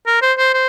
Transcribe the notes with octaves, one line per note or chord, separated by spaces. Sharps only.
A#4
C5
C5
C5